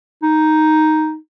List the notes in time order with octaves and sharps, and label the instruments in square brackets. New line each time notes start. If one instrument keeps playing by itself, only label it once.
[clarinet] D#4